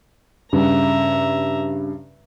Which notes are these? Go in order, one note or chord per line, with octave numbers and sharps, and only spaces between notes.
G2 C#3 E5 A#5